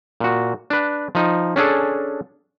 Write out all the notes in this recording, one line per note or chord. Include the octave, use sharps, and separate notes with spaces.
A#2 F#4
D4 B4
F3 D#4
C#4 D4 G#4 A4